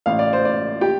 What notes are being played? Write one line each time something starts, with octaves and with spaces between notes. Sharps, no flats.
A1 F5
D5
C5
A1 D5
G4 G5